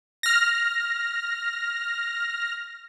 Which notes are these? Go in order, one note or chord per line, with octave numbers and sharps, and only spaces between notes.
F6 A#6